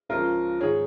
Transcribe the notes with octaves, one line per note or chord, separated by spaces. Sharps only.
C#2 C#3 F3 F4 A#4
G#2 D#3 G#4 C#5